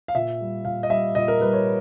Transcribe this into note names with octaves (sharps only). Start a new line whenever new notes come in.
F5
A#2 E5
G3
A#2 F5
D#5
G3 E5
A#2 D#5
A#4
G3 B4
C#5